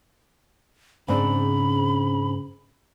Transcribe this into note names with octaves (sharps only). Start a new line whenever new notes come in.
G#2 C#3 C4 D4 B5